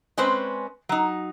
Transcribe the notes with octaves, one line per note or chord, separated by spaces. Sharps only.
G#3 C4 C#4 B4 C5
F#3 D#4